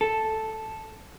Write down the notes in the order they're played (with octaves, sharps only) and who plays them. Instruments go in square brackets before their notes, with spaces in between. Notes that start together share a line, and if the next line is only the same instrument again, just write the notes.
[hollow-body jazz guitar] A4